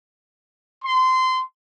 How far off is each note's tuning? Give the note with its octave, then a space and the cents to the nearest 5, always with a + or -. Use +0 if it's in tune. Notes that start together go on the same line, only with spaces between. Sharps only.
C6 -20